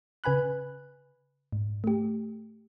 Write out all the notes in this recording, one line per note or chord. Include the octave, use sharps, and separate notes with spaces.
C#3 B4 G#5 B5 F#6
G#2
A3 G4